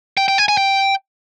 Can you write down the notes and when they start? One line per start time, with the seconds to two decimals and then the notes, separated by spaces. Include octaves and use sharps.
0.17 G5
0.28 G5
0.38 G#5
0.48 G#5
0.57 G5